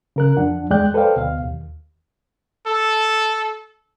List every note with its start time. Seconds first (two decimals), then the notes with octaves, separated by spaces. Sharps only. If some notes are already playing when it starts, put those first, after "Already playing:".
0.16 C#3 A#4 F#6
0.37 F2 F3 D4 F#5
0.70 E2 G#3 D5 G5 F#6 G6
0.94 A4 B4 C5 D5 F5 G5
1.16 D2 B2 F5
1.44 D#2
2.67 A4